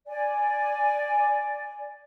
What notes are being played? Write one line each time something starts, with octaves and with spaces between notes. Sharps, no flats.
D5 G#5